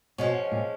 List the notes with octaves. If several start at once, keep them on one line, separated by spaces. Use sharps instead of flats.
B2 F3 G#3 C#4
A#2